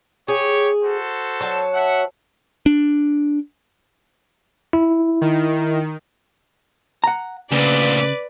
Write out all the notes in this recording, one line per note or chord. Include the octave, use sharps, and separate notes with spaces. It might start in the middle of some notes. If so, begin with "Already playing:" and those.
G4 G#4 C#5
F#4 A4 C5
F#3 C#5 A5
E5 F#5
D4
E4
D#3
F#5 A#5
D2 A#2 C#3 B4 D5